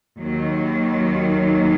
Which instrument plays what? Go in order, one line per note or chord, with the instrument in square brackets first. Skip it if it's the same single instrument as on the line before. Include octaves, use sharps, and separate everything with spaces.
[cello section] D#2 D#3 F#3